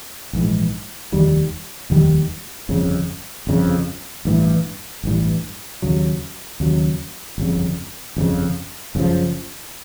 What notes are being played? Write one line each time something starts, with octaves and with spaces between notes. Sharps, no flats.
A#1 G#2 E3
F1 D#2 D#3 G3
F1 D#2 D#3 G3
G1 F2 C#3
G1 F2 C#3
A1 G2 E3
A1 G2 E3
D#2 C#3 F#3
D#2 C#3 F#3
G1 F2 C#3
G1 F2 C#3
F#1 F2 C#3 F3